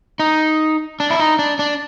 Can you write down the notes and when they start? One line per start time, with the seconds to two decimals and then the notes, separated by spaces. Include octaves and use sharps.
0.19 D#4
1.00 D4
1.10 E4
1.19 D#4
1.39 D4
1.59 D4